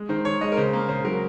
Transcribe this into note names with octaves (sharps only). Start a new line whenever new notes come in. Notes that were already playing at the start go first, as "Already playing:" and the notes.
Already playing: G#3
D#3 C5
D#3 C#5
G#3 D#5
A#4
C#3 C5
A#3
C#3 C5
F#3 A#4